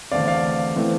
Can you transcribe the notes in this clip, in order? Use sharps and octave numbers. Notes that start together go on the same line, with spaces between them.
E2 D3 A3 C4 D5 F5
D5 F5
E3 A3 C4